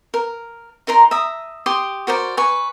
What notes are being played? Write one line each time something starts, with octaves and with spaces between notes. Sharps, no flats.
A#4
D#4 A#4 A#5 C6
E5 A#5 D#6
G4 C6 D6 D#6
F#4 A#4 C5 D5
B4 G#5 C#6